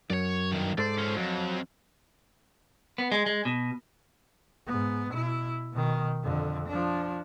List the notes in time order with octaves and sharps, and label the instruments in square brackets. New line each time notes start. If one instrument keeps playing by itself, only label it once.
[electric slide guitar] F#2 [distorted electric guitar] C#5 D5
[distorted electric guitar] G2 D#3
[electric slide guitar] G#2 A4 C5 [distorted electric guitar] D5
[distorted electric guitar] F3 C#4
[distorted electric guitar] F2 [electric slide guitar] F#3
[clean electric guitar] B3
G#3
G#3
B2
[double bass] G#2 B3
B2 E4
B2 D#3
F2 D3
F3 D4